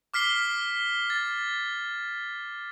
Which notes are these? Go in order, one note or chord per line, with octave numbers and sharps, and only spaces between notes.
D6 F6 B6 C7 G7
A6